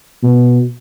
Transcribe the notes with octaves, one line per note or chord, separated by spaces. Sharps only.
B2